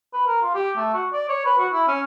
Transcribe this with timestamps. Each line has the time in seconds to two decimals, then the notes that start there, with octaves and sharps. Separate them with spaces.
0.14 B4
0.27 A#4
0.42 F4
0.55 G4
0.77 A3
0.94 F#4
1.13 D5
1.29 C#5
1.45 B4
1.58 F#4
1.73 E4
1.88 C#4